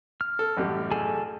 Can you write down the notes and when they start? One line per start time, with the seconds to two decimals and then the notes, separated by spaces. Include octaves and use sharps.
0.21 F6
0.39 A4
0.57 A1 F#2 G3
0.91 G#4 A4 G#5